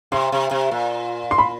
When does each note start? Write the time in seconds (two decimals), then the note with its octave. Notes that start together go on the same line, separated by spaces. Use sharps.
0.12 C3 C6
0.32 C3
0.51 C3
0.71 A#2
1.31 C6
1.38 B5